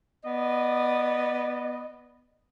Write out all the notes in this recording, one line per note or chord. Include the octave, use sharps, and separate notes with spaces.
B3 D5 D#5